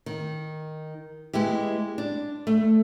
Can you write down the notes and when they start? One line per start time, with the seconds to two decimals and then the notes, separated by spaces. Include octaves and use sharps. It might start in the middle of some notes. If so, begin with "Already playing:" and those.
0.06 D#3
1.33 G#3 B3 E4 G4
1.98 D4
2.47 A3